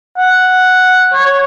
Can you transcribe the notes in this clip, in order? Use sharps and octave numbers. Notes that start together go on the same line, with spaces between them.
F#5
C#5